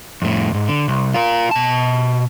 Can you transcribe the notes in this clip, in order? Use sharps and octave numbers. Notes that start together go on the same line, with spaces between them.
F2 A2
D#2 G#2
D3
C2
F4 A#4
B2 A5